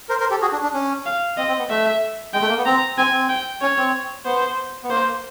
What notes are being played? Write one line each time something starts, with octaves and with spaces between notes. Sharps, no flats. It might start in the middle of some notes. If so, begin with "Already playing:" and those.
A#4 C5
A#4 C5
G4 A4
F#4 G#4
D4
D4
C#4
F5
C4 D#5
C4
B3
A3 E5
G#3 G5
A3
A#3
B3
C4 A#5
C4 G#5
C4
G5
C#4 C#5
C4
B3 C5
B3
A#3 C5